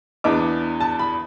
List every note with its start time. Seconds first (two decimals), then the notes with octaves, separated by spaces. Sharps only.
0.24 E2 E3 B3 D4 D6
0.80 A5
0.99 B5